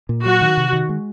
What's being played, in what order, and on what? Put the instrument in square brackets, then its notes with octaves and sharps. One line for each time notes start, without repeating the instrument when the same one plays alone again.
[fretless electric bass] A#2
[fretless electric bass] F#3 [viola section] F#4
[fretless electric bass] D#3
C3
D#3
G#3